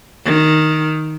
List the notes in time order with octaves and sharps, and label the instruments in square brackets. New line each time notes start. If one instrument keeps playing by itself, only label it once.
[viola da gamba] D#3